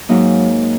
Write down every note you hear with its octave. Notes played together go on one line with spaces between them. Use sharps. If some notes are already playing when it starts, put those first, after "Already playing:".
Already playing: A#5
G#2 F#3 A#3 D#4